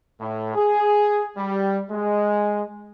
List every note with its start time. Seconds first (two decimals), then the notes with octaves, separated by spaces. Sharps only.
0.21 A2
0.55 G#4
1.37 G3
1.91 G#3